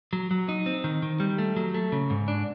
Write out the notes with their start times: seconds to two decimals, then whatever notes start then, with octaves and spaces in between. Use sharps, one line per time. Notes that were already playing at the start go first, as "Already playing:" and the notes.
0.13 F#3
0.31 F#3
0.49 D#4
0.66 C4
0.84 D#3
1.02 D#3
1.20 G3
1.38 A3
1.56 F#3
1.74 A3
1.92 C#3
2.10 G#2
2.28 D4